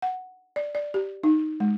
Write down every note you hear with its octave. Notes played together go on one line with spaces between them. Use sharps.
F#5
D5
D5
G4
D#4
G#3